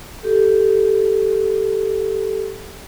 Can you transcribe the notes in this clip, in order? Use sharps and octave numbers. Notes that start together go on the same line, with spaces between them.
G4 A4